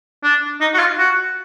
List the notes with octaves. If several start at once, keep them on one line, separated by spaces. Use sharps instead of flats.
D4
D#4
F#4
F4
F#4